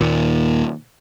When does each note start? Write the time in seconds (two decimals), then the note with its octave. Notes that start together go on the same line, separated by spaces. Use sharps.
0.01 D#2 A#2